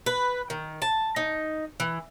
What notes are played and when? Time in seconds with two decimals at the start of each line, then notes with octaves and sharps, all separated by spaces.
0.06 B4
0.50 D#3
0.82 A5
1.16 D#4
1.80 E3